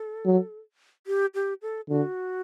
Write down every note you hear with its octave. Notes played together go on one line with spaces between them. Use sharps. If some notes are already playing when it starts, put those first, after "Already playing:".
Already playing: A4
F#3
G4
G4
A4
D3 F#4